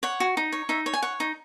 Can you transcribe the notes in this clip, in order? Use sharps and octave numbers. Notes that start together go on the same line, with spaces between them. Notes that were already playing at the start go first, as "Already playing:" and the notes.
C#5 F#5
F#4
D#4
C#5
D#4 E5
C#5
G#5
C#5 F#5
D#4